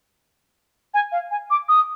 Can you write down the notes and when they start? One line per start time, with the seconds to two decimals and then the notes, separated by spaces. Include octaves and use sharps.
0.94 G#5
1.12 F5
1.31 G#5
1.50 D6
1.69 D#6